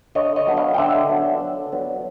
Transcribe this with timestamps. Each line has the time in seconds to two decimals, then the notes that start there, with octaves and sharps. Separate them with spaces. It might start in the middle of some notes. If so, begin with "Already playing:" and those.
0.15 D3 C#5 D#5
0.36 C#5 D#5
0.47 F#3 B3 D4
0.57 D#5 F5
0.74 G5
0.78 D3 E5 F#5
1.09 F#3 B3 D4
1.41 D3
1.72 F#3 B3 D4